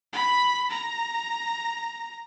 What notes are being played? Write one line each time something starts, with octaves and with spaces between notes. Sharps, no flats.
B5
A#5